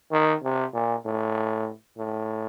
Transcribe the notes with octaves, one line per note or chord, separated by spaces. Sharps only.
D#3
C3
A#2
A2
A2